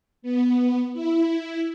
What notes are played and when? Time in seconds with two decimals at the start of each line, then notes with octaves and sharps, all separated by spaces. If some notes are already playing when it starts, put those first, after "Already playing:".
0.22 B3
0.93 E4